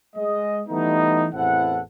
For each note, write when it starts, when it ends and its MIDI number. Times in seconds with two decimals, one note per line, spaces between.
0.16 0.61 56
0.16 0.61 75
0.69 1.27 52
0.69 1.27 55
0.69 1.27 57
0.69 1.27 59
0.69 1.27 63
1.34 1.80 33
1.34 1.80 40
1.34 1.80 60
1.34 1.80 64
1.34 1.80 69
1.34 1.80 78